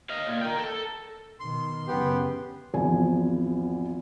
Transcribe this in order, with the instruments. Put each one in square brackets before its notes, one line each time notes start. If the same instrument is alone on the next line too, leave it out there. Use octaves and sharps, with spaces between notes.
[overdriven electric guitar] D#5 F5
A#2
A#4 G5
A4
[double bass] B2 D#3 [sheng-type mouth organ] C6
[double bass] F#2 C#3 [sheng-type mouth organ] B3 G4 C6
[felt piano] G#1 E2 F3 G#5